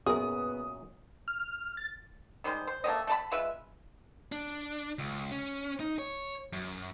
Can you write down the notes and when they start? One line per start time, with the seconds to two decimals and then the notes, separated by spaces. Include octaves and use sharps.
0.06 F#2 A#2 B3 G#4 A#4 D#6
1.28 F6
1.77 A6
2.44 D#3 G3 G#3 C5
2.67 C5
2.84 A3 A#3 G4 D#5
3.07 A3 A5 B5
3.32 G#3 F4 B4 E5
4.32 D4
4.99 C#2
5.31 C#4
5.80 D#4
5.99 C#5
6.53 F#2